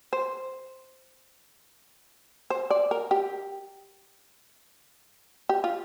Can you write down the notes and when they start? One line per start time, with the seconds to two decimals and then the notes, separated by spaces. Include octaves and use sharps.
0.13 C5
2.50 C5
2.70 D5
2.91 A#4
3.11 G4
5.49 G4
5.64 F4